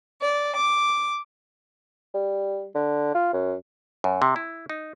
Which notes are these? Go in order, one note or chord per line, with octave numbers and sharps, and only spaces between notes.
D5
D6
G3
D3
F4
F#2
F#2
C3
E4
D#4